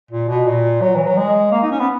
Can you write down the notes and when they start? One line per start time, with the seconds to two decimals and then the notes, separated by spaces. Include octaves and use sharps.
0.11 A#2
0.28 B2
0.46 A#2
0.81 F#3
0.95 E3
1.06 F#3
1.17 G#3
1.51 A#3
1.62 D#4
1.71 C#4
1.80 B3